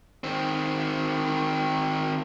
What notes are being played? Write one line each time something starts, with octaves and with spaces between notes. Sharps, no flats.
D#3 C4